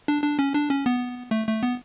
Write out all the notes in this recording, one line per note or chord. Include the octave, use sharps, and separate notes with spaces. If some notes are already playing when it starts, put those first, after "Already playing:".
D4
D4
C#4
D4
C#4
B3
A3
A3
B3